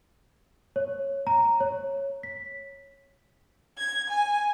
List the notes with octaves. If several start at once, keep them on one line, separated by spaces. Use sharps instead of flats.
C#5
A#5
C#5
B6
G#6
G#5